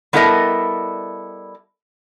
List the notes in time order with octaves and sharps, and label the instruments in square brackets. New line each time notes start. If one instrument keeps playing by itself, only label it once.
[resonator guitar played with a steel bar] G3 B3 E4 A4 A#4 D#5